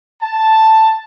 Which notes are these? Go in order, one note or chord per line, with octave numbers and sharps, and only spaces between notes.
A5